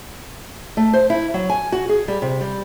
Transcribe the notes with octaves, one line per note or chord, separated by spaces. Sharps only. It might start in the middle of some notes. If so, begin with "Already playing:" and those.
A3
C5
E4
F#3
G#5
F#4
G#4
G3
C3
G3